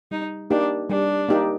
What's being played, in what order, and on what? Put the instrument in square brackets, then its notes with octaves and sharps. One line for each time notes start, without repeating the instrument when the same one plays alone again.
[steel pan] G3 [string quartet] D#4
[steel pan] A#3 D#4 G4 [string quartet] D4
[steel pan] G3 [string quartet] D4
[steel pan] A#3 D#4 G4